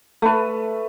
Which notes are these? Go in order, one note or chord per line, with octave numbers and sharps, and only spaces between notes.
A3 B4